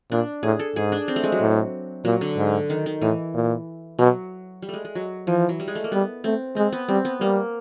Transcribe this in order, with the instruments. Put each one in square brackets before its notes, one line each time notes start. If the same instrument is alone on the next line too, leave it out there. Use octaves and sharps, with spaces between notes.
[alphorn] A#2 [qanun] D4
[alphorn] A2 [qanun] G#4
[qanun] A4
[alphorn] G#2 [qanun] G#4
[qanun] D4
C4
A3
G#3
F#3
[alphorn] A2
[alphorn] A#2 [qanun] F#3
[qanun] D3
[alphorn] G#2
[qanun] D#3
D#3
[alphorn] A2 [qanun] E3
[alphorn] A#2
[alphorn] B2 [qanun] F#3
[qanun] G3
G#3 A3
G#3
F#3
[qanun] E3 [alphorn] F3
[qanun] F#3
G3
G#3
A3
A#3
[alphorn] G3 [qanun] B3
[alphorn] A3 [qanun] C4
[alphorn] G#3 [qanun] C4
[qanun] B3
[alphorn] G3 [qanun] C4
[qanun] B3
[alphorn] G3 [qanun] A#3